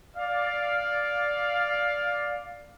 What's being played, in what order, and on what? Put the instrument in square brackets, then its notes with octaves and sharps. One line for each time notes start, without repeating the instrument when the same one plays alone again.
[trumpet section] D5 F5